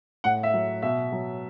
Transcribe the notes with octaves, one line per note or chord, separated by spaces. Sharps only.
A2 F#5
E5
F#3
B2 E5
F#3